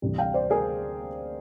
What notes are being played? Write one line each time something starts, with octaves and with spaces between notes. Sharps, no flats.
D2 C3 E3 G3
F5 G5
C5 D5
G#4 A#4